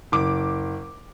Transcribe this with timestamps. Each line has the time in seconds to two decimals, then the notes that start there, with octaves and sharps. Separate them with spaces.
0.12 F#1 D6